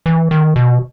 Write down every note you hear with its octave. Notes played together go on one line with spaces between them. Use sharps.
E3
D#3
B2